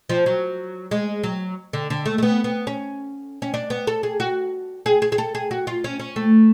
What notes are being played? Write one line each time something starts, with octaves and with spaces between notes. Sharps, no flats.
F3
F#3
G#3
F#3
D3
D3
A3
A3
B3
B3
C#4
C#4
D4
B3
A4
G#4
F#4
G#4
G#4
G#4
A4
G#4
F#4
F4
C#4
C#4
A3